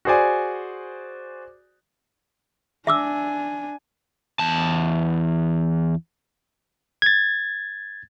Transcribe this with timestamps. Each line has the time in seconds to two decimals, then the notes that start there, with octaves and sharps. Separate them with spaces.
0.05 F#4 G#4 C5 D5 G#5
2.87 D4 E5 G#5 D6 E6
4.39 E2 A5
7.02 G#6 A6